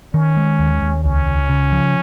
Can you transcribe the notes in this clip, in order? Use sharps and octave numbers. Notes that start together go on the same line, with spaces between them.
D#3 C#4
G#3
D#2
D#2
C#2 C#4
C#2
C#3
F3